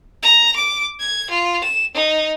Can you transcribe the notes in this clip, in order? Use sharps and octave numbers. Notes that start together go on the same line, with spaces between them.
A#5
D6
G#6
F4
E7
D#4